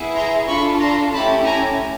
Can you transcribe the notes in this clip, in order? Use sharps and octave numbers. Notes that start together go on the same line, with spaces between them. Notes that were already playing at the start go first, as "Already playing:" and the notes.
Already playing: B3 E4 G#4
A#5 C6
D4 F4 A4 B5 C#6
A#5 C6
A3 C#4 E4 G4 A5 B5
G#5 A#5